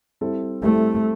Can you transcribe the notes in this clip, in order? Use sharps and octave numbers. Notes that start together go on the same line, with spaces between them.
G3 C4 E4 A4
G3 A3 C4 E4 A4